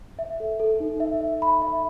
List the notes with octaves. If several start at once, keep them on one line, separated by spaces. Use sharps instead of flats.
E5
A4
A4
D#4
E5
E5
B5
E5